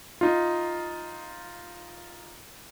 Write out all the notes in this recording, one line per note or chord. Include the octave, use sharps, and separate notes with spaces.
D#4 F4